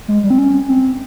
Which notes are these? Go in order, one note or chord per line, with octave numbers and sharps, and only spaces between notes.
G#3
G3
C4
C#4
C4